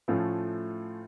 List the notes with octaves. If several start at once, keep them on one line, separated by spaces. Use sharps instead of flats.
A2 F3 A3 C#4 F4